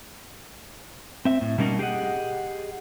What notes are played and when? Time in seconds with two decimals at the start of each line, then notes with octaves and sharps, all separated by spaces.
1.25 C4 E5
1.41 A2
1.58 B2 G3 A#3 C#4 D#4
1.79 G4 G#4 B4 D#5 F#5